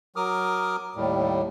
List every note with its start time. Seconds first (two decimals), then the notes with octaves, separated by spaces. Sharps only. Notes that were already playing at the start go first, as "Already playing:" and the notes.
0.16 F#3 A#4 D6 D#6 F6
0.96 D#2 A2 G3